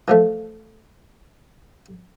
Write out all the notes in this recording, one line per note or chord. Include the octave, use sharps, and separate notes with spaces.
E3 F3 A3